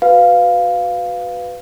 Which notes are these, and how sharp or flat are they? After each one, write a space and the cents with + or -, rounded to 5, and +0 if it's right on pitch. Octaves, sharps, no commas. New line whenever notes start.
F#4 +0 B4 +5 F5 +0